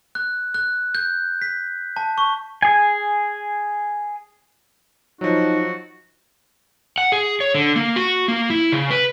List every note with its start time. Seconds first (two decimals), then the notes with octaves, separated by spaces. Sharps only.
0.15 F#6
0.54 F#6
0.95 G6
1.42 B6
1.97 A5
2.18 C#6
2.62 G#4 G#5
5.21 F3 F#3 D#4 F#4
6.98 F#5
7.12 G#4
7.40 C#5
7.55 D3
7.76 A#3
7.96 F#4
8.28 A#3
8.50 E4
8.72 C#3
8.90 B4